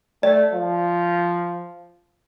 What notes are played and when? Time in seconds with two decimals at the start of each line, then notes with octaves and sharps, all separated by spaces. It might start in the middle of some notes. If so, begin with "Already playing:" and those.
0.23 A3 D5
0.54 F3